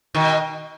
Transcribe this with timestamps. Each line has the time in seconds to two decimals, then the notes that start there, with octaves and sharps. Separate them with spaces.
0.14 B2 D#3